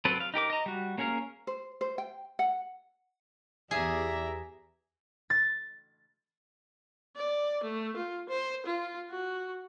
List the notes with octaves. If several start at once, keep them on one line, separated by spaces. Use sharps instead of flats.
F#3 C4 A4 B4
F5
D#4 G4 A#4 D6
D#5 A#5
G3 F#4
A#3 C#4 G#4 A#4 F5
C5
C5
G5
F#5
E2 G4 G#4 D5 E5 A#5
A6
D5
A3
F4
C5
F4
F#4